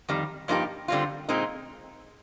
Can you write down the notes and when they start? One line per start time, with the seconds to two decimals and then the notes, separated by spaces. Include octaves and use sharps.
0.08 F2 D#3 G3
0.48 G2 F3 A#3 D#4 G4
0.88 D3 G3 C4 F4
1.29 A#2 G#3 C4 D#4